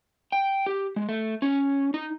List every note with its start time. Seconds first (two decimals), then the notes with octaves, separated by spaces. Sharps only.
0.32 G5
0.66 G4
0.96 G#3
1.09 A3
1.42 C#4
1.94 D#4